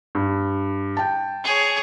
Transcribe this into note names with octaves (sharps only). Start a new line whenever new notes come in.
G2
G5 A5
G#4 C#5